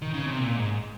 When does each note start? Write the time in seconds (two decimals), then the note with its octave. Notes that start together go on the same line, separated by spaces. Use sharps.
0.02 D#3
0.14 C#3
0.27 C3
0.38 A#2
0.56 G#2